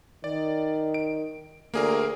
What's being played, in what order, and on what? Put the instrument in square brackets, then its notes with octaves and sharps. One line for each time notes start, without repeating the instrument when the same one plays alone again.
[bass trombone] D#3 [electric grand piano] D5
[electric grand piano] D7
[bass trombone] D2 [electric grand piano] A#3 G#4 A#4